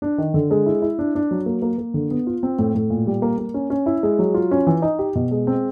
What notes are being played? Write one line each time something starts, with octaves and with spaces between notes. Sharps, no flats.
D4
D#3
D3
G#3
E4
E4
D4
D4
F#3
A#3
A#3
A#3
D3
B3
F4
C4
A2
A2
A#2
G3
A#3
A#3
C#4
C#4
E4
G#3
F#3
F4
C#4
E3
D#4
G4
B2
G#3
C4